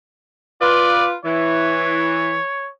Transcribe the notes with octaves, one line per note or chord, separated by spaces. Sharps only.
F4 B4 D5
E3 C#5